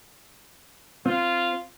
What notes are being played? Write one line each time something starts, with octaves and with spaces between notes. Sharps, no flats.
C4 F4